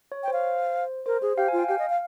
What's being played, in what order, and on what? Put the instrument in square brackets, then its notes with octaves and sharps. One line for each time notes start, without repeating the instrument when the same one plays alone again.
[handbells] C#5
[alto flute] G5
[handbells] C5
[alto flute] F5
[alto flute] A#4 [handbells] C5
[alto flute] G#4 [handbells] C5
[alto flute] G4 [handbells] F5
[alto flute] F4 [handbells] G#5
[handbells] G5
[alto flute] G4 [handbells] F5
[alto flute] D#5
F5